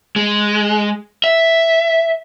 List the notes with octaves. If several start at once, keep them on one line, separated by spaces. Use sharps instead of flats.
G#3
E5